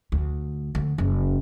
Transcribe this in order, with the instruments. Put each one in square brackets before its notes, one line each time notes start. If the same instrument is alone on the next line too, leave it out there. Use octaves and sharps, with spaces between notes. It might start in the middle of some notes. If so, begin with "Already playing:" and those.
[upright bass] D2
D2
F#1